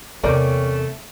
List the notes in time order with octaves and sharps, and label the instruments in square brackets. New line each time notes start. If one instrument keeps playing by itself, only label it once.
[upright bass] E2 C3 [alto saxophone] A3 [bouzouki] C#4 G5 [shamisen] A#4 D5